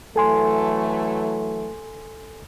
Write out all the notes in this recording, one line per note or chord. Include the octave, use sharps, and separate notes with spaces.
E3 F#3 A3 A4 G#5 C6